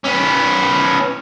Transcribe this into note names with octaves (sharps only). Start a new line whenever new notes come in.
B3 C#4